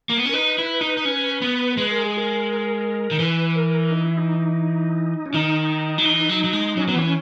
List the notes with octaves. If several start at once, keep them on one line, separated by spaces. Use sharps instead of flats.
A#3
B3
C#4
A#4
D#4 B4
E4
D#4
D#4
C#4
B3
G#3 B4
A#4
G#4
A#4
D#3
E3 B4
A#4
D#4
E4
D#4
C#4
D#3 D#4
F#3
E3
F#3
F#3
G#3
F#3 C#4
F#3 B3
E3 C#4